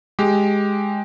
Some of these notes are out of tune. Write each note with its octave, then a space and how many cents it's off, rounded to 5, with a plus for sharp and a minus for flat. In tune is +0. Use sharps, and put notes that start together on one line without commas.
G#3 +0 G4 +0